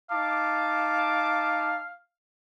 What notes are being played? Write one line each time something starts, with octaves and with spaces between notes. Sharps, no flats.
D#4 F5 A5 D6